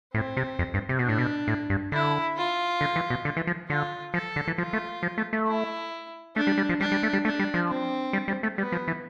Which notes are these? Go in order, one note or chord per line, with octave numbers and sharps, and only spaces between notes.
A2 C4
C3
F2
G2
C3
B2 D4
A2
B2
A2
G2
D3 E4
F4
D3
E3
B2
D3
E3
F3
D3 F4
F3 A4
D3
E3
F3 F4
A3
F3
A3
A3
E4
A3 D4
G3
G3
F3
G3 D4
G3
A3
G3
A3 D4
G3
F3
C4
G3
G3
A3
G3 B3
F3
E3